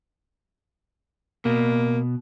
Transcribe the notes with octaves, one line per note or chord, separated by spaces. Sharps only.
B2 A#3